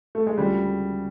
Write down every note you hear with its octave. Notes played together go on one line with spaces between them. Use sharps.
A3
G#3
D2 C#3 F3 G3